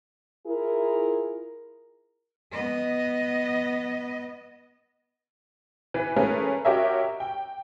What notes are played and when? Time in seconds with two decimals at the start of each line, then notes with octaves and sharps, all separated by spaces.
0.46 E4 F4 G#4 A#4
2.52 B3 D#5
5.94 E3 B4
6.16 A3 C#4 G#4 A#4 B4
6.65 F#4 G4 A#4 C#5 D#5 E5
7.20 G5